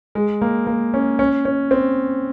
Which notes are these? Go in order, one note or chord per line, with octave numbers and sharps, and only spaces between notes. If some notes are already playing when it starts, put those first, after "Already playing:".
G#3
A#3
A#3
C#4
C#4
C#4
C4